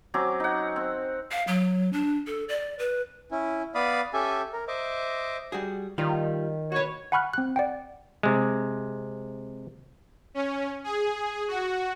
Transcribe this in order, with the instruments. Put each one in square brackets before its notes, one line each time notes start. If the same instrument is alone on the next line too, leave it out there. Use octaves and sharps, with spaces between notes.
[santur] F#3 C4 C#4 D6
D#4 F#5
C4
[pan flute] F5
F#3
D4
A4
D5
B4
[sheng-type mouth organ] C#4 E4
B3 D5 F5 B5 D#6
C#4 G4 A4 E5 G#5
A#4
C5 D#5 E5 D6
[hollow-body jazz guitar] G3 F#4 G#4
[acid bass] D#3 [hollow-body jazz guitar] G3 F4
[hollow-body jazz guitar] F#4 B4 [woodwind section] C#5
[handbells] F#5 G#5 B5 C#6 F6 F#6
C4 F#6
D5 F#5 G5
[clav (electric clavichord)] C3 G#3
[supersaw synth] C#4
G#4
F#4